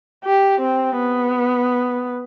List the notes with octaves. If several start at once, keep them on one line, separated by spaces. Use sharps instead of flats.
G4
C4
B3